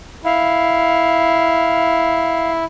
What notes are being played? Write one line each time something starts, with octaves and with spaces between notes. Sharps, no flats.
E4 F5